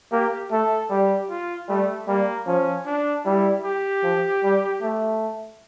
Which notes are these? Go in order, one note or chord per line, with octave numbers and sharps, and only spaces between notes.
A#3 G4
A3 A4
G3 G4
F4
G3 A3
G3 A#3
F3 C#4
D4
G3 E4
G4
F3
G3
A3